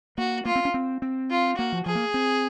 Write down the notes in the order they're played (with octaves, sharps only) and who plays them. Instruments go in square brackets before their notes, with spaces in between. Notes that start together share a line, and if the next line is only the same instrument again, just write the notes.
[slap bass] A#3 [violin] F#4
[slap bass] A#3 [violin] F4
[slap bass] C4
C#4
C4
C4
[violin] F4
[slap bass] A#3 [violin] F#4
[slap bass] F3
[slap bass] F3 [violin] G#4
[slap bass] A#3
C4